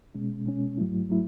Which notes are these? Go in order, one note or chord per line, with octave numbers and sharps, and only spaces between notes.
B2 G#3 C#4
B2 G#3 C#4
G#2 F#3 A3 E4
F#3 A3 E4